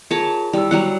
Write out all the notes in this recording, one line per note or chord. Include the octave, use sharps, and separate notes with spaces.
F4 G#4 A#4 C#5 A5
G3 E4 G4 E6
F#3 G3 F#5